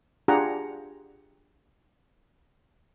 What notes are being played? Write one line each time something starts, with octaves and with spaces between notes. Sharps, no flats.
D4 F4 G4 G#4 F#5 A#5